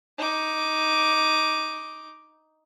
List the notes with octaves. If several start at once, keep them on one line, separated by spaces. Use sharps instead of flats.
D#4 D6